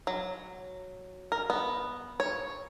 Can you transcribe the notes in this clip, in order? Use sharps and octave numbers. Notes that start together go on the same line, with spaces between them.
F#3
A#4
B3
C#5